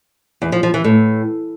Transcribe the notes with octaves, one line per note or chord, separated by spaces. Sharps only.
E2
F3
F3
E3
A2